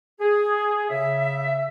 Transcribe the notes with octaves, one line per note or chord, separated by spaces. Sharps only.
G#4
C#3 E5